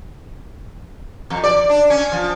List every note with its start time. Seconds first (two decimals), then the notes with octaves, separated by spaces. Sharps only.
1.30 F2
1.44 D5
1.69 D4
1.90 C#4
2.12 F3